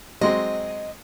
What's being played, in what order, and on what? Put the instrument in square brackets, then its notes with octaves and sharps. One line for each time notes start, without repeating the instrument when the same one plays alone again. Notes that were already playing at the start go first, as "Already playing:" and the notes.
[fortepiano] F#3 G#3 C4 [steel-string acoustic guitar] D#5